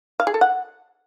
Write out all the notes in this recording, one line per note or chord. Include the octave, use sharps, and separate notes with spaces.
F5
G#4
A4
F#5